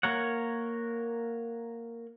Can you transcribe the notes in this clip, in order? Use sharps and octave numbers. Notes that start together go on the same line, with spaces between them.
A#3 A#4 C#5 F#5